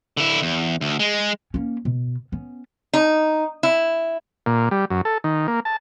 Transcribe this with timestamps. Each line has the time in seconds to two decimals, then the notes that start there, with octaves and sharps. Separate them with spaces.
0.17 D3 E4
0.42 E2
0.81 D2
0.99 G#3
1.54 A#3 C#4
1.85 B2
2.32 B3 C#4
2.93 D#4
3.63 E4
4.46 A#2
4.71 G3
4.90 F#2
5.05 A4
5.24 D#3
5.48 A#3
5.65 A5